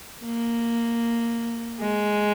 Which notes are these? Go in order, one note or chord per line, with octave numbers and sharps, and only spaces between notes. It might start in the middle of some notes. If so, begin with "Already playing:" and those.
A#3
G#3